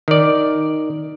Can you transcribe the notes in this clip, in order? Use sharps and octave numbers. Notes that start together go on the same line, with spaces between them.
D#3 D5